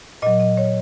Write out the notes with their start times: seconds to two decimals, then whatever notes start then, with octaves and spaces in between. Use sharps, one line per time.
0.22 A#2 F#3 D#5
0.40 D#5
0.57 C#5